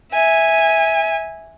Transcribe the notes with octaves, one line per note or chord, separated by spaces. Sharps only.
E5 G#5